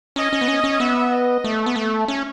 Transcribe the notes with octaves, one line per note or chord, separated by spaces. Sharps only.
C#4 D#5
C#4
B3
C#4
C#4
B3 E5
D#5
A3
B3
A3
C#4